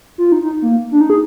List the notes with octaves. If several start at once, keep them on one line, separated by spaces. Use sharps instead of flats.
F4
D#4
D#4
A#3
D4
D#4
G#4